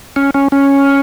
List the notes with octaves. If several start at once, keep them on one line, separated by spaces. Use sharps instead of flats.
C#4
C#4
C#4